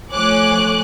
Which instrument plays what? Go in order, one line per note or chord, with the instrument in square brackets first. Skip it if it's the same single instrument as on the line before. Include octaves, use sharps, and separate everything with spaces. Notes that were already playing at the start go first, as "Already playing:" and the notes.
[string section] F3 A3 C#5 G#5 D6 F#6